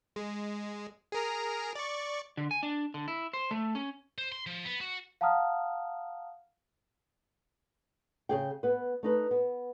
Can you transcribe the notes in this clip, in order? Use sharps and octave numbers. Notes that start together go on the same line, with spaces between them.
G#3
G#4 A#4 A#5
D5 C#6
D3
G#5
D4
D3
E4
C5
A3
C#4
C5
C6
F3
B3
F#4
F5 F#5 A5 A#5 D#6 F6
C#3 G#4 G5
B3 B4
A3 D#4 B4
B3